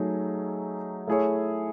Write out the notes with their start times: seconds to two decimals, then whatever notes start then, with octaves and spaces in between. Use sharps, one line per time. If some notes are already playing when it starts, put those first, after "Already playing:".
Already playing: F#3 A3 D#4 G#4
1.08 A3 E4 G#4 C#5